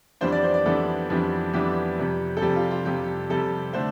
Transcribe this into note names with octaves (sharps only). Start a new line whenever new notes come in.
F2 E3 G3 B3 D4 C5
D5
C5
D5
F2 E3 G3 B3 D4 A4
F2 E3 G3 B3 D4
F2 E3 G3 B3 D4 G4
F2 C3 G3
A4
F2 C3 G3 G4
F4
F4
F2 C3 G3 G4
F2 C3 G3 A4
D3 A3 D4 C5